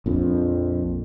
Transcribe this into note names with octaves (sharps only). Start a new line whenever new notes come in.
A#1 F2